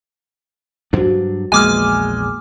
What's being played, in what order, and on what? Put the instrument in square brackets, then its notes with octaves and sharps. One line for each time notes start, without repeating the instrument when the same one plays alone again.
[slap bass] G2 F#3 D4 [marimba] F#4 C5
[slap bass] A#1 E2 [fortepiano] G#3 D#6 [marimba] A#3 [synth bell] G#5 D6 F6